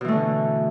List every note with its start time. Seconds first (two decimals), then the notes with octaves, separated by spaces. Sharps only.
0.01 B2
0.05 E3
0.08 A3
0.12 D3